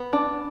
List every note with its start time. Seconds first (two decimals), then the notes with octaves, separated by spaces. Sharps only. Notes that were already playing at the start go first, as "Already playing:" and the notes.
Already playing: B3
0.13 D4